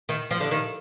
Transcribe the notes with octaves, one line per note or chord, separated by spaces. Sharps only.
D#3
F3
D3
D#3